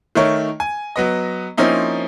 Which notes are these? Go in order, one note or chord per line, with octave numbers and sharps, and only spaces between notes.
D#3 A3 A#4 C#5
G#5
F#3 B3 D#5
F3 A#3 C4 C#4 D#4 E4